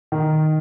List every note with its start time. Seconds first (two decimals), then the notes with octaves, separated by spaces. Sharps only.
0.12 D#3